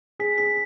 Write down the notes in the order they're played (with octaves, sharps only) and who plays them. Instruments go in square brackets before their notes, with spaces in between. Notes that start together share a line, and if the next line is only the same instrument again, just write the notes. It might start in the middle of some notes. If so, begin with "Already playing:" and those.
[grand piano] G#4 [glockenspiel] B6
[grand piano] G#4 [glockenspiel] B6